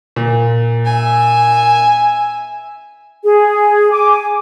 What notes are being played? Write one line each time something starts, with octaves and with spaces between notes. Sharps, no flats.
A#2
E5 G#5
G#4
G#5 D6